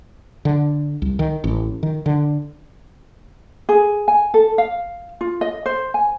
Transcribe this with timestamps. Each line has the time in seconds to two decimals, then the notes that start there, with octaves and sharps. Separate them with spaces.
0.45 D3
1.02 C2
1.19 D#3
1.44 A1
1.83 D#3
2.06 D3
3.69 G#4
4.08 G#5
4.34 A4
4.58 F5
5.21 F4
5.41 D#5
5.66 C5
5.94 G#5